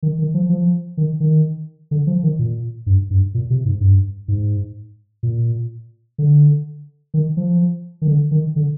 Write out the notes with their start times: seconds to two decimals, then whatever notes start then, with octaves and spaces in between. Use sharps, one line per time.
0.03 D#3
0.18 D#3
0.34 F3
0.49 F3
0.97 D#3
1.20 D#3
1.91 D3
2.07 F3
2.23 D#3
2.39 A#2
2.86 G2
3.11 G2
3.34 A#2
3.50 C3
3.65 G#2
3.81 G2
4.28 G#2
5.23 A#2
6.18 D3
7.14 D#3
7.37 F3
8.02 D#3
8.07 D3
8.31 D#3
8.56 D3